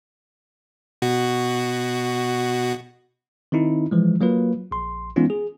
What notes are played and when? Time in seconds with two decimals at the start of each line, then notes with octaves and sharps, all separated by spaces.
1.02 B2 F#4
3.52 D#3 C4 D#4 E4
3.91 E3 F3 G#3
4.21 F#3 A#3 F4 B4
4.71 A#1 C6
5.16 E3 G#3 B3 C#4 D#4 F4
5.30 G#4